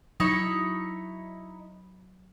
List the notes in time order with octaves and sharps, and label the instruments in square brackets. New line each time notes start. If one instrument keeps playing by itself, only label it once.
[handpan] F#3 [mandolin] D#4 E4 C#5